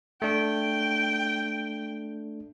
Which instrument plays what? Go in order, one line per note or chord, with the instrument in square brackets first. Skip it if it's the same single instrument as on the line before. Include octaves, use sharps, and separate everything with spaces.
[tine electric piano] A3 D4 [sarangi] G5